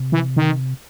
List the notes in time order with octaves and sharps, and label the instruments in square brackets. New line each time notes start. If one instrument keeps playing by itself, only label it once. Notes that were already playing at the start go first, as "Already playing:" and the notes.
Already playing: [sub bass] C3
[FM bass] E3
D#3